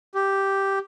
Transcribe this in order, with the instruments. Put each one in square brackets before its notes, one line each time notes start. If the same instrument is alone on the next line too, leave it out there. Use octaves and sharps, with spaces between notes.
[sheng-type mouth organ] G4